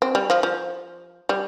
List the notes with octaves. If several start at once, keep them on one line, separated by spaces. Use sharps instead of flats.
C4
G3
F3
F3
G3